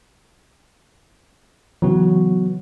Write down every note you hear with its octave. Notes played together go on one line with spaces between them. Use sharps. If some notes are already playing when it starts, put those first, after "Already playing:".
C#3 E3 F#3 B3 F#4